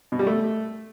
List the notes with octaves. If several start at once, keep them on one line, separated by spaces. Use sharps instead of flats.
B2
G3
A3